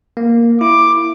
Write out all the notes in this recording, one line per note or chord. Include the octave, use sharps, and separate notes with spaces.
A#3
E4 D6